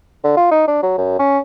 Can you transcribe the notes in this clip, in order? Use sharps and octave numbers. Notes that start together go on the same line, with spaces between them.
D3
F4
D#4
D4
F#3
F#2
C#4